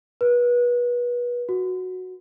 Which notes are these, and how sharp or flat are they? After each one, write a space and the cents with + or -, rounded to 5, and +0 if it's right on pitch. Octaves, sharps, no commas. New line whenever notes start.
B4 -30
F#4 -5